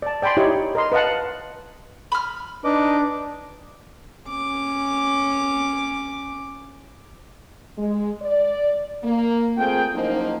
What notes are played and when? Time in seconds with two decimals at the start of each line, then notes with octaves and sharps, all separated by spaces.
0.02 D5 A5
0.22 D5 G5 G#5 B5 C6
0.37 D#4 E4 G4 C#5
0.75 A#4 D#5 C6
0.92 B4 D#5 F5 F#5 A5
2.12 B5 F6
2.64 D4 D#4 B4 D#5 D6
4.29 C#4 D6
7.78 G#3
8.22 D5
9.04 A#3
9.57 A3 C4 F4 G#4 A#4 G5
9.94 F#1 F3 A#3 D#4